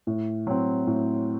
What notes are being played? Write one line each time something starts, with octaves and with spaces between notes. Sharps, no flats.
A2
F#3 C4
A2